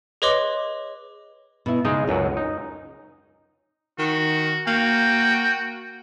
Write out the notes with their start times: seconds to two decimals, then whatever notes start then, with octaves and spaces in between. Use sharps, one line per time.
0.22 G#4 B4 C#5 D#5 C6 D6
1.66 B2 E4
1.85 C#3 G#3 D#4 D#5
2.07 C#2 F#2 C#5 D#5 F#5
2.37 D#4
3.99 D#3 F#4
4.67 A#3 F#4 G5